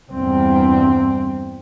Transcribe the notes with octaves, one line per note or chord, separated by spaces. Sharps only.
E2 G2 C4